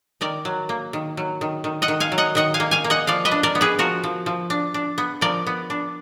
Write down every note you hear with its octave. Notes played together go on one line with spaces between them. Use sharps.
D#3 A#4 D5
F#3
A#3
D#3
F#3
D#3
D#3
D#5 F#5
D#3
F5 G#5
F#3
D#5 F#5
D#3 D#5 F#5
F5 G#5
A#3
F5 G#5
A#3
D#5 F#5
F3 D5 F5
B4 D#5
D4
A#4 D5
B3
G#4 B4
F3 F#4 A#4
F3
F3
D4
D4
B3
F3 A#4 D5
B3
D4